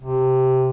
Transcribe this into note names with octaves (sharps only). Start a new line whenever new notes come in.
C3